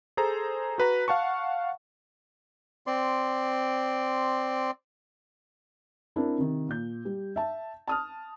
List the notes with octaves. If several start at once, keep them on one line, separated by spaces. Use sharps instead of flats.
G#4 A4 C5 A#5
F#4 B4 A#5
F5 F#5 A5 C#6
C4 D5 C6
C4 D4 E4 A#4
C3 D#3
A#2 G6
G3
E5 A5
A5 D#6 F6